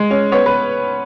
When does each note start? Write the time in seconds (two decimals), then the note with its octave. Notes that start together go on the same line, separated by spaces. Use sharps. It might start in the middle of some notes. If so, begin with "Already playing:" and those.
Already playing: G#3
0.11 C#4
0.32 B3 C#5
0.46 B4